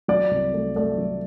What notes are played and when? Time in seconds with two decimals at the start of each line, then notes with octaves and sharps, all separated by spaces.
0.08 F#3 D5
0.31 C2
0.54 A3
0.76 A3 D5
0.98 F#3